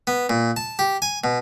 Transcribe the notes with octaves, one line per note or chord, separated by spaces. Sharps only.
B3
A#2
A5
G4
G#5
B2